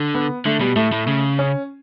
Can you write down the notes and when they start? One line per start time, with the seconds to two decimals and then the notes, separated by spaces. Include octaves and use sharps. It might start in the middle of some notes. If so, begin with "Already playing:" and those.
Already playing: D3
0.15 B3
0.45 D3 A3
0.61 B2 G3
0.76 A2 A3
0.92 A2
1.07 C#3
1.39 C#4